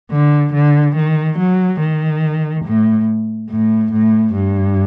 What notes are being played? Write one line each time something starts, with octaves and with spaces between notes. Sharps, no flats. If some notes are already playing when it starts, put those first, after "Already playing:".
D3
D3
D#3
F#3
D#3
A2
A2
A2
G2